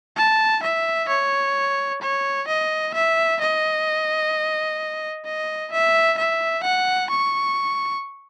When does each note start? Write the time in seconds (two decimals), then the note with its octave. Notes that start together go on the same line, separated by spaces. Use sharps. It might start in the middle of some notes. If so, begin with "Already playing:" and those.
0.17 A5
0.63 E5
1.09 C#5
2.02 C#5
2.48 D#5
2.94 E5
3.41 D#5
5.25 D#5
5.72 E5
6.18 E5
6.64 F#5
7.10 C#6